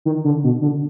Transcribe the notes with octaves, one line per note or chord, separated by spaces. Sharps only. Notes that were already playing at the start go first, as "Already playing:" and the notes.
D#3
D3
B2
D3